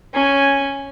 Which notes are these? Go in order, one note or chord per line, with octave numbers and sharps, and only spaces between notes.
C#4 G#5